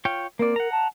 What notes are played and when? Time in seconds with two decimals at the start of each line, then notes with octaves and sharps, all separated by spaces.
0.05 F4 C#5 G5
0.39 A#3 C4 A#4 D5
0.56 F#5 A#5
0.72 A5